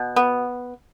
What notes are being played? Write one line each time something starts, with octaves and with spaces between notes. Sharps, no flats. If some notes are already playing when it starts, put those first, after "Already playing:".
Already playing: B2
B3